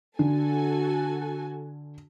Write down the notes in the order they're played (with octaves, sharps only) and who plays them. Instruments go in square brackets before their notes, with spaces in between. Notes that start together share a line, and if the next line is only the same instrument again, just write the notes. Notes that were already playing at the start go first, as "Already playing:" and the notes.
[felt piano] D3 [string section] F#4 A4 G#5